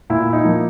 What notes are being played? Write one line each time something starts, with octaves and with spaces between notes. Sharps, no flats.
A#2 E4
D#4
F3 A#3